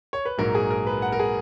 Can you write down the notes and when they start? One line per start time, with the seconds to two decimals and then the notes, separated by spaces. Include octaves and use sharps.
0.13 C#5
0.25 B4
0.38 A#1 G#2 F#3 A#4
0.55 G#4
0.70 A#4
0.87 B4
1.02 F#5
1.12 A#4
1.19 G#4